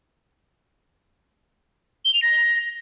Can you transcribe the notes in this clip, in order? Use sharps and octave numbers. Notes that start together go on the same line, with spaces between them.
G7
F7
A#6